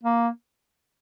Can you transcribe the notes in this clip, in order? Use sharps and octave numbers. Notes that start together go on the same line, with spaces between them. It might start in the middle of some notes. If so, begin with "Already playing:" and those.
A#3